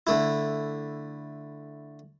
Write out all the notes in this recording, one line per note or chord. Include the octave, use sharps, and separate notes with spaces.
D3 A3 E4